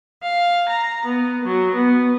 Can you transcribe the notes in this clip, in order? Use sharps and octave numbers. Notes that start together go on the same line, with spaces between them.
F5
A#5
B3
F#3
B3